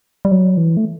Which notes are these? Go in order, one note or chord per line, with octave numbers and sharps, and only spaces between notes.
G3
F#3
E3
A3